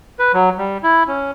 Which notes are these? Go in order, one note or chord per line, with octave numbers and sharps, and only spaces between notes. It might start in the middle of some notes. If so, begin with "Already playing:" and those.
B4
F#3
G3
E4
C#4